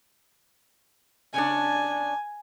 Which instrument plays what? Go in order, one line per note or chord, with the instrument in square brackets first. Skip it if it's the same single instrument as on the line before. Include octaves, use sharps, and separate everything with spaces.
[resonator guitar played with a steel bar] C#3 C#4 D4 [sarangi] G#5